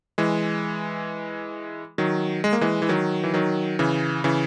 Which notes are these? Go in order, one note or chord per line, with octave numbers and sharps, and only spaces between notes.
E3 G#3
D#3 F#3
G#3
A#3
E3 G#3
E3
D#3 F#3
E3
D#3 F#3
C#3 E3
C#3 E3